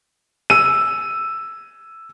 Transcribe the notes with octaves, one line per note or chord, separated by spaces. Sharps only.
E6 D#7